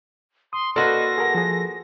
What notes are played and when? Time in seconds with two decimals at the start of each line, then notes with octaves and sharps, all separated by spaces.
0.53 C6 D#6
0.76 A#3 F#4 A4 B4 D5 D#5 C6 A#6
1.18 G#4 A#4 F#5
1.35 F3 G#4